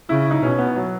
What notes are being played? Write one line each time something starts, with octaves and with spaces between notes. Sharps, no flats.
C#3 E4
D#4
B2 C#4
B3
F#3